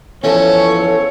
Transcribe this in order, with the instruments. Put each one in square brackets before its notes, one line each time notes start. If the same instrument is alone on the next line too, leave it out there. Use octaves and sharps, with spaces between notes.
[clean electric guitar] E2 F3 [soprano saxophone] C#4 [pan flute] A4 [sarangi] C#5